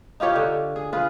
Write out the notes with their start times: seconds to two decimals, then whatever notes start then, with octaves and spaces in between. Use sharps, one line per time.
0.20 D#4 F4 G4 C#5
0.36 D3
0.76 G#4
0.93 F4 G#4 B4